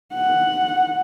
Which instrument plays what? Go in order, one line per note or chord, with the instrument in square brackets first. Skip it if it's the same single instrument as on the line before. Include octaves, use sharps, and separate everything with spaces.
[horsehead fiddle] F#5